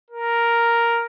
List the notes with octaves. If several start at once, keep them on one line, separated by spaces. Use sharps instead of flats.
A#4